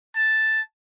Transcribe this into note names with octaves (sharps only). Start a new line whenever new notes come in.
A5